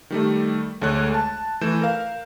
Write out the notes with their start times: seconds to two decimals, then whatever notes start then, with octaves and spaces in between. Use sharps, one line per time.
0.10 D#3 G3 A3
0.82 D2 G#3 A3 C#5 F#6
1.14 A5
1.61 E3 A3 G6 E7
1.82 A#4 F5